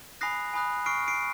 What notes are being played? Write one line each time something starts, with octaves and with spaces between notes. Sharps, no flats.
G#5 B5 D#6 F#6 A#6 C7
G#5 B5 D#6 F#6
C#6 F6 C7 D7
C7 D7